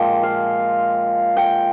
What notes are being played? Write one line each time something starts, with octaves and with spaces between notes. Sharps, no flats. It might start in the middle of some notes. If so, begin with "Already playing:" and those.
Already playing: A#2 F3 G#3 G5
F5
G5